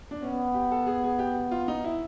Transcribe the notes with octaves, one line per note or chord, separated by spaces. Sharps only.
D4
B3 C#4
G4
A4
G#4
G#4
G4
F4
D#4
E4